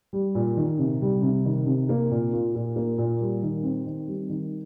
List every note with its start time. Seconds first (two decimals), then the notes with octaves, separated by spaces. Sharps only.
0.13 G3
0.35 A#2
0.57 D#3
0.79 C3
1.01 G3
1.22 C3
1.45 D#3
1.66 C3
1.89 A#3
2.11 A#2
2.33 F4
2.55 A#2
2.76 A#3
2.98 A#2
3.21 G3
3.43 D#3
3.63 C4
3.86 D#3
4.08 G3
4.29 D#3